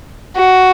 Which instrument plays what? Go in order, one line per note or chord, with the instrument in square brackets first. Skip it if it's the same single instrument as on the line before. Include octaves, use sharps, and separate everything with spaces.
[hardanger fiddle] F#4